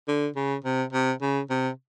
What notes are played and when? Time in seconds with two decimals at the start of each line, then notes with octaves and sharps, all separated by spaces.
0.08 D3
0.36 C#3
0.65 C3
0.93 C3
1.21 C#3
1.50 C3